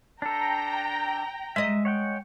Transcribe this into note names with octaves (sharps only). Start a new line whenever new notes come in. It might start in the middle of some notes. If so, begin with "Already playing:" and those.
D4 A4 G5 A#5
G#3 D#5 E5
C#5 F#5 G5